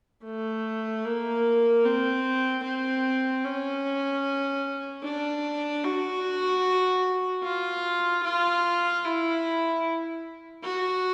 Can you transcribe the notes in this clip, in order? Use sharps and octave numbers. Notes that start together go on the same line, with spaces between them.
A3
A#3
C4
C4
C#4
D4
F#4
F4
F4
E4
F#4